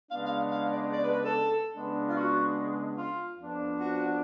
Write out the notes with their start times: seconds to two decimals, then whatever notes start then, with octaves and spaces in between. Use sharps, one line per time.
0.10 C#3 G#3 B3 D4 F5
0.24 F5
0.51 F5
0.72 D5
0.92 D5
1.03 B4
1.13 B4
1.23 A4
1.74 C#3 G#3 B3 D4
2.08 F4
2.15 F#4
2.98 F4
3.39 F2 F3 B3 D4
3.80 F#4